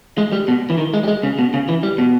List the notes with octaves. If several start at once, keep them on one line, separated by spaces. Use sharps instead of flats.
G#3
G3
B2
E3
D#3
G#3
G3
G#3
C#3
B2
C#3
E3
G3
B2